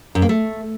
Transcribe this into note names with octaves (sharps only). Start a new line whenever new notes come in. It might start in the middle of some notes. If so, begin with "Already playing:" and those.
F#2
A#3
A3